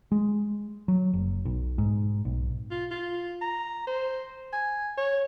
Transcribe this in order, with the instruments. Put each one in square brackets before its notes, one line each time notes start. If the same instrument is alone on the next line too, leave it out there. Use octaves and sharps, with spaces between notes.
[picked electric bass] G#3
F#3
F#1
B1
G#2
B1
[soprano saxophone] F4
F4
A#5
C5
G#5
C#5